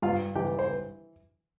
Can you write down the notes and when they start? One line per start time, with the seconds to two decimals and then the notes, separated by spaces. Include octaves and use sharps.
0.02 G2 F4 F5
0.35 E3 G4 G5
0.59 C5